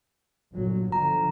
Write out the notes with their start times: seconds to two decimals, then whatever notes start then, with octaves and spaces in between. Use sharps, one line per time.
0.54 G1 A#2 F#3
0.92 D3 F3 A#5